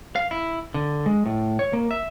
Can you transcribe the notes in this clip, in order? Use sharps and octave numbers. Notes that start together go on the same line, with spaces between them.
F5
E4
D3
G#3
A2
C#5
A#3
E5